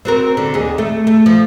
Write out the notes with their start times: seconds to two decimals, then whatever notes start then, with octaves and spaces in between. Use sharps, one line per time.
0.05 C4 F#4 A#4
0.37 D3
0.54 D#2 G#4
0.78 A3
1.07 A3
1.26 F3